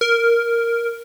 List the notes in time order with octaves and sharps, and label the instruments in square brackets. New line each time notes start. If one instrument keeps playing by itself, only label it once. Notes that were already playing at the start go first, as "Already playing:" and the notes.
[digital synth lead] A#4